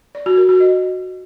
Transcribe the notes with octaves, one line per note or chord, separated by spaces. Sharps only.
D5
F#4
A#4
F#4
D#5